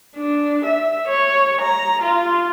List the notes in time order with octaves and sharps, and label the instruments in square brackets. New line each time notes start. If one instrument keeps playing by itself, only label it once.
[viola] D4
E5
C#5
A#5
F4